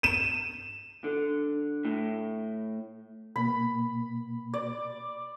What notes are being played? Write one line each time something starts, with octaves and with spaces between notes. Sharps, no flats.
D#7 E7
D3
A2
B2 A#3 B5
D5